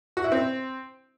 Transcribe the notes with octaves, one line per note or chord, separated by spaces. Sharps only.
F#4
E4
C4